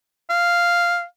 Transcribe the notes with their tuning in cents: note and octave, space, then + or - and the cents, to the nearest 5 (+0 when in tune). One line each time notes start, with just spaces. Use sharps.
F5 -5